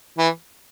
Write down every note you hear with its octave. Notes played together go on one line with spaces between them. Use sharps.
E3